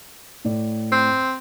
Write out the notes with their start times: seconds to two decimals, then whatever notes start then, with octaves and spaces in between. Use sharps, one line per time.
0.45 A2 D5
0.92 C4